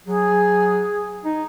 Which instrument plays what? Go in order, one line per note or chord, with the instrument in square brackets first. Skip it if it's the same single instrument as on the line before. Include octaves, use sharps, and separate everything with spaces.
[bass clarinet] F#3 [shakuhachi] G#4
[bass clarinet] D#4